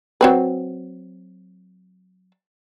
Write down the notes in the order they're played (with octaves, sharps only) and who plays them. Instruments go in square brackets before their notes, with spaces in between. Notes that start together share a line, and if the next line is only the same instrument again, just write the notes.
[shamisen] F#3 C4 B4